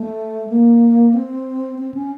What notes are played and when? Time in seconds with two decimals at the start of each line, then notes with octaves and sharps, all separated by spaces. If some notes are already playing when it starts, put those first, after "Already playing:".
Already playing: A3
0.49 A#3
1.14 C4
1.79 C4
1.94 C#4